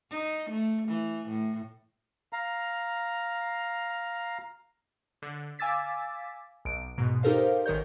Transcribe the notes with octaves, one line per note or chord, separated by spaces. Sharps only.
D#4
A3
E3
A2
F5 A#5
D3
F5 G#5 D6 E6 A6 B6
B1 D7
G#2 B2
D#4 G4 A4 A#4 C5 F5
A1 D#3 A#4 C#5 G6